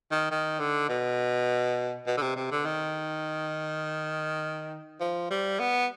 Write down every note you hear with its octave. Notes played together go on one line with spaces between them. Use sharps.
D#3
D#3
D3
B2
B2
D3
C3
C3
D3
D#3
F3
G3
B3